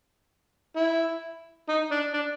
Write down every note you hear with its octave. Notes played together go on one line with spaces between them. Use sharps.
E4
D#4
D4
D4